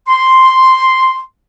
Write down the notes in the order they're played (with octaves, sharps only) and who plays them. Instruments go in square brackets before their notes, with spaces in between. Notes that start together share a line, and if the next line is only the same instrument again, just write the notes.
[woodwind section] C6